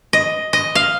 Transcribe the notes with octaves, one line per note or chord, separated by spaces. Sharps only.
D#5
D#5
F5